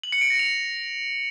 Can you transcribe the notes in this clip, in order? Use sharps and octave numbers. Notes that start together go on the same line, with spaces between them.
F#7
C#7
D7
A#6
F7